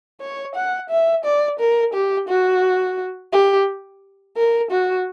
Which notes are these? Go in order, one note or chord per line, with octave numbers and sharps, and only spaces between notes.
C#5
F#5
E5
D5
A#4
G4
F#4
G4
A#4
F#4